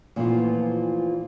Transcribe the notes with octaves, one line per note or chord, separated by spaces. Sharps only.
A#2 E3 F3 A3 B3 F4